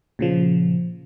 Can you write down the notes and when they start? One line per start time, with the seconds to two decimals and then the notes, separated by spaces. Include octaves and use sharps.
0.19 A#2 C#3 F3